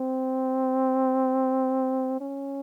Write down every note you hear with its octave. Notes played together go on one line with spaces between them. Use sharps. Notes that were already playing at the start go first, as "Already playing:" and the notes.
Already playing: C4
C#4